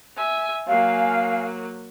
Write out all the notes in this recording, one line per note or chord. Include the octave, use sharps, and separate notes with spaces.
E5 G#5
F#3 A#3 F5 G#5